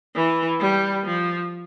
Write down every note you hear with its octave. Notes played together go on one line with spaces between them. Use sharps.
E3
G3
F3